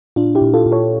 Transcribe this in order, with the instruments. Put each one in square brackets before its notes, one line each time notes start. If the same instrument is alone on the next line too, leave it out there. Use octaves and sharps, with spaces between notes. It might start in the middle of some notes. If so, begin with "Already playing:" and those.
[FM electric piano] A#2 D4 F4
E4 G4
A#2
F4 A4
A#2
A4 C#5